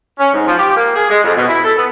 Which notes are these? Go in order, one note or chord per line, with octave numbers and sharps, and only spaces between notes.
C#4
G#2
F3
G4
A#3
G#4
G#3
F2
B2
E4
A4
B3